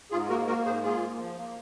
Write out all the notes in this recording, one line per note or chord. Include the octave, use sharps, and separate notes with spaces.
G#2 F4 G#4
A#3 F#4 A#4
A#3 F#4 A#4
G#2 G#4 C5
A#3 F4 G#4
A#3
F3
A#3